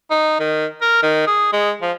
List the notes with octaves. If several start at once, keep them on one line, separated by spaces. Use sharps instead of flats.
D#4
D#3
A#4
D#3
G#4
G#3
F3